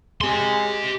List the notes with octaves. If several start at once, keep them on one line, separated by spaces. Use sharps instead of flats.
G#3 G4 C6